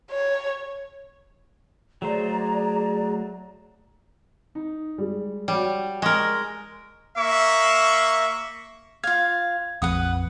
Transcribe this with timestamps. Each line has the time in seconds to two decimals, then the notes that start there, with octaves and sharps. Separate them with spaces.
0.11 C#5
2.02 F#3 A3 G#4 C5 D5 A#5
4.55 D#4
4.98 G3 G#3
5.48 G3 F#4 C#5
6.02 G#3 A#4 C#6 A#6
7.17 A#3 E5 C#6
9.04 F4 F5 G#6
9.82 A#1 F2 B4 F#5 D#6